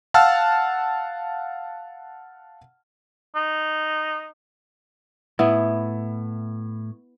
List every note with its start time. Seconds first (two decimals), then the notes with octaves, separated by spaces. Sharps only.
0.14 F5 F#5 A5 E6 F6
3.36 D#4
5.39 A2 B3 E4